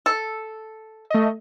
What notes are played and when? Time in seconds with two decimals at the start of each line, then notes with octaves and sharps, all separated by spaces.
0.06 A4
1.10 A3 D#5